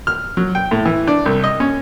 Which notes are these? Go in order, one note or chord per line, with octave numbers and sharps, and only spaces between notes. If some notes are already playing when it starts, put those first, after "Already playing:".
F6
F#3
G5
A2
E3
D4
C2
D#5
C#4